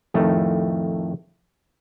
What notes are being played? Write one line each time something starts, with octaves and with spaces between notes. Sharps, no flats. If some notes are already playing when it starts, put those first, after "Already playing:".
F2 A2 D#3 A3